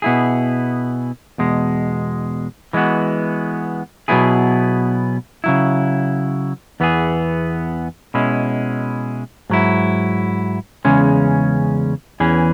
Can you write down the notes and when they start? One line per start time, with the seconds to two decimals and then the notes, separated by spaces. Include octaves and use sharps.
0.02 B2 B3 E4 G#4
1.38 E2 B2 G#3
2.73 E3 G#3 B3 F#4
4.08 B2 F#3 B3 E4 G#4
5.44 C#3 F#3 E4
6.80 E2 E3 B3 G#4
8.14 B2 G#3 C#4 E4
9.50 G#2 F#3 E4
10.85 E2 C#3 G#3 C#4
12.20 E2 E3 C#4 G#4